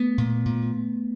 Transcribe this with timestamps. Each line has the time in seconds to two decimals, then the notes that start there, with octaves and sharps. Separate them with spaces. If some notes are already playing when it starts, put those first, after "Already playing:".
Already playing: A3 B3
0.18 A#2
0.46 A#2